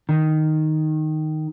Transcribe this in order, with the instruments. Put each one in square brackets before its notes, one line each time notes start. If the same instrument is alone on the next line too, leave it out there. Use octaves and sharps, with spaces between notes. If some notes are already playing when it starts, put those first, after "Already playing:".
[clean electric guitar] D#3